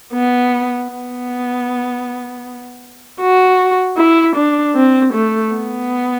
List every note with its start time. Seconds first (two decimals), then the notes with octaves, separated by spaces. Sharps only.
0.13 B3
0.90 B3
3.21 F#4
3.97 E4
4.36 D4
4.75 C4
5.13 A3
5.52 B3